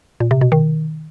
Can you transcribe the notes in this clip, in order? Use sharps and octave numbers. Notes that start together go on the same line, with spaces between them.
A#2
C3
B2
D#3